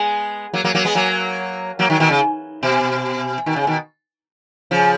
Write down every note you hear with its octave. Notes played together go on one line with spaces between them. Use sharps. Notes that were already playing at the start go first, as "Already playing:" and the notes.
Already playing: G#3 B3
F#3 A#3
F#3 A#3
F#3 A#3
G#3 B3
F#3 A#3
F#3 A#3
D#3 F#3
B2 D#3
C#3
B2
B2 D#3
C#3
B2 D#3
C#3 F3